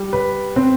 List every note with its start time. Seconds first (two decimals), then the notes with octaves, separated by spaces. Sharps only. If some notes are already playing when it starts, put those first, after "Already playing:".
Already playing: G3
0.13 B4
0.56 C4